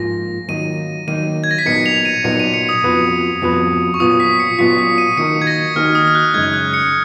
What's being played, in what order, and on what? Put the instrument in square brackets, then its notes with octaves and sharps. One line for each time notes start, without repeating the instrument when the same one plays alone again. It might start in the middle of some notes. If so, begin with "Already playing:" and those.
Already playing: [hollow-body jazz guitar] G#2 F3 A#3 F4 [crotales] A#6
[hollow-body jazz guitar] D#3 F#3 A#3 D#4 [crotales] D#7
[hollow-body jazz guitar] D#3 F#3 A#3 D#4 [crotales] D#7
[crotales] G#6
A#6
B6
[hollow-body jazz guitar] A#2 F#3 B3 D#4 A#4 [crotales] C#7
[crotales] F7
D#7
[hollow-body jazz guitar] A#2 F#3 B3 D#4 A#4 [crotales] C#7
[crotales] D#7
C#7
D#6
[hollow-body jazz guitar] F2 F3 B3 F#4 B4
F2 F3 B3 F#4 B4
[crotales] C#6
[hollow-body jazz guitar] A#2 F#3 B3 F4 [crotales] D#6
[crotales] B6
C#7
[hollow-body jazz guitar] A#2 F#3 B3 F4 [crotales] B6
[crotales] B6
D#7
[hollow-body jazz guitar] D#3 A#3 D#4 F#4 A#4 [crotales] C#7
[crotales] G#6
A#6
[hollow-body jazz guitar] D#3 A#3 D#4 F#4 A#4 [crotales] F6
[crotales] D#6
F6
F#6
[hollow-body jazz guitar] F#2 C#3 G#3 D#4 [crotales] G#6
[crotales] F#6
C#7